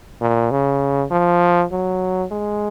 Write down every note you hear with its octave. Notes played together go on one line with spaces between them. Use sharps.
A#2
C#3
F3
F#3
G#3